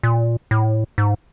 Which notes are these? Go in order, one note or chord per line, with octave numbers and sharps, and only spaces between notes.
A#2
A2
G#2